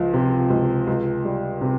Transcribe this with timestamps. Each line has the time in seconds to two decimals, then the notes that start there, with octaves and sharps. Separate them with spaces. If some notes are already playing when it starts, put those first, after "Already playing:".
Already playing: C#2 F3
0.14 C3
0.50 C#2
0.87 C#2
1.24 G3
1.61 C3